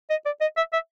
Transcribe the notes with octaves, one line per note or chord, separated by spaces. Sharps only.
D#5
D5
D#5
E5
E5